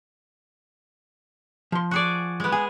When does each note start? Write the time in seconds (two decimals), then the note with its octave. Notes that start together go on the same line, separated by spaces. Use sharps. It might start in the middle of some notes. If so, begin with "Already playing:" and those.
1.72 F3 C6
1.91 F#4 G#4 D5
2.40 G#3 B3
2.52 G#4 G#5